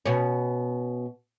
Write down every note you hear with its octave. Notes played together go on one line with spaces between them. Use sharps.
B2 C#4